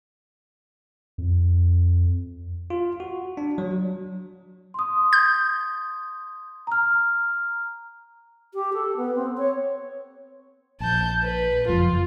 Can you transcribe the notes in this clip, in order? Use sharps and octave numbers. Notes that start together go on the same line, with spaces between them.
F2
F4
F#4
D4
F#3
C6 D#6
G6
A#5 F6
G4
A4
B3
C4
C#5
A#1 A5 G6
B4
F#1 F2 F3 F4